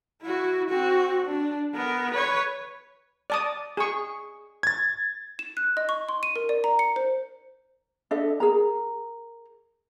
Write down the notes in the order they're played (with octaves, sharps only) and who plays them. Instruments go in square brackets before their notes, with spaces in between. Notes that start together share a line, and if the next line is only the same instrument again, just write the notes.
[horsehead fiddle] E4 F#4
C4 F#4
D4
B3 A#4
B4 C#5
[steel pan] D5 A5 D#6
G#4 C#6
[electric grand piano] G#6 A6
[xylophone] E7
F#6
D#5
C#6
C6
D#7
A#4
D5
A#5
C#7
C5
[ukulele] D4 A4 D#5 E5
G#4 A#4 A#5